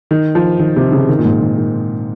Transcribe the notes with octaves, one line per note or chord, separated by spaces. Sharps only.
D#3
F3
D#3
C3
C#3
D#3
A#2
G#2
D#3
D#3